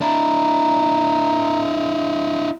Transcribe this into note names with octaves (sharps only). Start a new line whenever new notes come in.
D4 E4 A#5